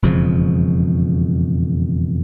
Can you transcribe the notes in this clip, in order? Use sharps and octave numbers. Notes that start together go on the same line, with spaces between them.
E1 F2 C#3 F3